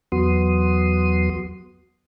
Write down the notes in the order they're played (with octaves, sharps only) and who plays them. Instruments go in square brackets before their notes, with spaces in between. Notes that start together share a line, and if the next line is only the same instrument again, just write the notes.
[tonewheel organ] E2 F#3 B3 F#4 C6 D#6